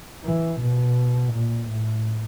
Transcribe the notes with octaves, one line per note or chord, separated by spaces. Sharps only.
E3
B2
A#2
A2